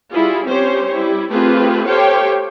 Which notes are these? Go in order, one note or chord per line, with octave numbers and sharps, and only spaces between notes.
G3 E4 F4 G#4
G3 C4 C#4 G4 C5 C#5
G3 E4
A3 C4 F4 G4 G#4 B4
G4 A4 C5 C#5 F5 G5